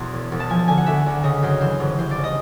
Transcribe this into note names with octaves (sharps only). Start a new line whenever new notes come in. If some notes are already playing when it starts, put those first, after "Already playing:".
Already playing: E2 B2 C6
E1
E1
A5
F3 G#5
A5
D3 G#5
F#5
D2 E5
D2
C#3 D#5
F#2 C5
E3 C5
G1
E3 C5
D5
C#3
D#5